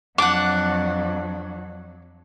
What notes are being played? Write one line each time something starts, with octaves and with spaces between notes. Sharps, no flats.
F2 F#3 D4 F#5 D6